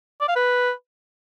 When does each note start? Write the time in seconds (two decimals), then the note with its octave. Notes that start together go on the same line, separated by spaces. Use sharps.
0.21 D5
0.28 F5
0.36 B4